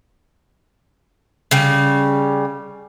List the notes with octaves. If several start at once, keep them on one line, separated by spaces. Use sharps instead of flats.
C#3 G3